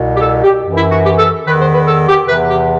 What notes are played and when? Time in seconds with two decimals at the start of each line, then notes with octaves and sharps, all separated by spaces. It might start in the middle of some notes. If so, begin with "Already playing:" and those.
Already playing: C2 B2
0.17 G4
0.22 A4
0.44 G4
0.63 F#2 E3
0.78 E4
0.92 F#4
1.05 G4
1.19 A4
1.46 E2 D#3 B4
1.60 C5
1.73 B4
1.88 A4
2.08 G4
2.29 E2 C3 E3 B4
2.50 G4